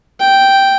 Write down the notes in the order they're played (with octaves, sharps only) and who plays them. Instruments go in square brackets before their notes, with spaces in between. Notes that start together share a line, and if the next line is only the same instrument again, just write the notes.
[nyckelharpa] G5